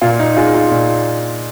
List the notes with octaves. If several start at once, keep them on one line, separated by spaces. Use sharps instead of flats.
A#2 F4
D#4
G#3 F4
F4
A#2